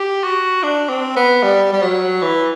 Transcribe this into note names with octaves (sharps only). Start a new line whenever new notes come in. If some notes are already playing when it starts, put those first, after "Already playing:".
Already playing: G4
F#4
D4
C4
B3
G3
G3
F#3
E3